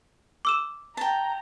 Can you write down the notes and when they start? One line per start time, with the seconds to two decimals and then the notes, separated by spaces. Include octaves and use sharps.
0.45 D6 E6 E7
0.97 G5 A5 A#5